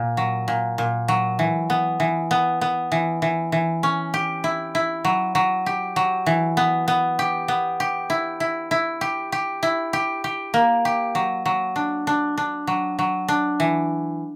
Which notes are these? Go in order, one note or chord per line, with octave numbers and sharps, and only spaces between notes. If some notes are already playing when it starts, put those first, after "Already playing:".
Already playing: A#2
F#3
A#2
A#2
F#3
E3
B3
E3
B3
B3
E3
E3
E3
C#4
G4
E4
E4
F#3
F#3
G4
F#3
E3
B3
B3
G4
B3
G4
E4
E4
E4
G4
G4
E4
G4
G4
A#3
G4
F#3
F#3
D4
D4
D4
F#3
F#3
D4
E3